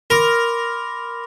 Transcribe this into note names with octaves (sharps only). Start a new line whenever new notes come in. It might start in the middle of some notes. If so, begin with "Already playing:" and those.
A#4 B5 C6 D6